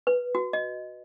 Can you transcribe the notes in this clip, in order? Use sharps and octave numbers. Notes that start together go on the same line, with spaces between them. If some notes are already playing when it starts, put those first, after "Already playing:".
B4
F#4
D#5